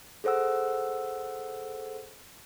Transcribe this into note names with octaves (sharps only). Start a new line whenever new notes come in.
G#4 A4 C5 F#5 E6